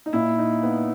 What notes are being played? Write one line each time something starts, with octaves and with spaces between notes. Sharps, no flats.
D#4
A#2 E4
D#4
B3